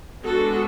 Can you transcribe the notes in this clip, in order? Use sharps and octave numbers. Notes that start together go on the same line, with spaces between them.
G#3 B3 D4 F#4 A4